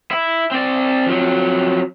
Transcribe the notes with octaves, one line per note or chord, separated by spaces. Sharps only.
E4
C4 D5
F2 F#3